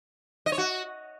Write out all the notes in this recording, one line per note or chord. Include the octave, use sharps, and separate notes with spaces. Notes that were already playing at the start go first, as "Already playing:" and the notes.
D#5
C#5
F#4